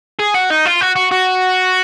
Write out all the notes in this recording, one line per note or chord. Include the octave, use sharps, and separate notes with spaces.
G#4
F#4
D#4
F4
F#4
F#4
F#4